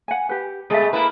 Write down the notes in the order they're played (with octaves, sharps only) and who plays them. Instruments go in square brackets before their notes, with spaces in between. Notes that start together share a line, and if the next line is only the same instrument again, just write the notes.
[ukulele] F#5 G#5
G4 B4
[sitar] B2 G#3 A3 [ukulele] G#4 A4 E5
[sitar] A#3 E4 B4